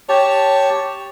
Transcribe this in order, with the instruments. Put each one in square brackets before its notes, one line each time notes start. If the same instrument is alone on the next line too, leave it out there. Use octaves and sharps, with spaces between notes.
[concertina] G4 A5 [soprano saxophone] C#5